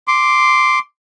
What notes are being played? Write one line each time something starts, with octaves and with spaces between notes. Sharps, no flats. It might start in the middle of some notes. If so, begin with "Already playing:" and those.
C6 D6